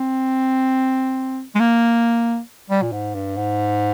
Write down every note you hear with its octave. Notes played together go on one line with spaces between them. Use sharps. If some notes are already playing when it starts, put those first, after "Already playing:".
Already playing: C4
G#3
A#3
G3
A#2
G#2
G2
G#2